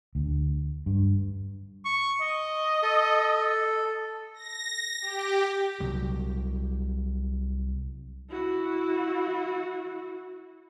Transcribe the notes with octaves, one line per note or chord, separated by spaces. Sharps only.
D2
G2
C#6
D#5
A4
A#6
G4
C2 F#3
E4 F#4